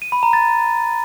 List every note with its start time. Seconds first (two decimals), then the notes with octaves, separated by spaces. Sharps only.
0.02 D#7
0.12 B5
0.23 A#5
0.33 A6